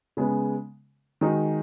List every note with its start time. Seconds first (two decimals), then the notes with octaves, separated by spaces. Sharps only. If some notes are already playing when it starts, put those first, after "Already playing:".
0.17 C#3 G#3 B3
1.21 D#3 G#3 D#4 F#4